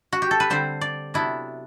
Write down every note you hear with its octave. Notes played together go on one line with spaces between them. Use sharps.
F#4
G4
A4
B4
D3 G3 C4 C5
D5
C3 F#3 B3 D4 E4